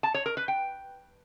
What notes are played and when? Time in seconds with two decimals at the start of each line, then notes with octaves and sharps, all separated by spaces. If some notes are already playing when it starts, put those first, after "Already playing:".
0.03 A5
0.14 C#5
0.26 A#4
0.37 B4
0.48 G5